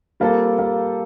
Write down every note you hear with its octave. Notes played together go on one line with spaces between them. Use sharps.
G3 A#3 C4 F4 A4
A#3